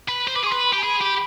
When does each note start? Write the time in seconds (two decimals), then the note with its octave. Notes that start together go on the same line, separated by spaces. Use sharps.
0.09 B4
0.27 C5
0.35 B4 D6
0.44 G#4 C6
0.52 B4
0.65 B5
0.73 G4
0.78 G#5
0.82 G#4 B5
1.01 G4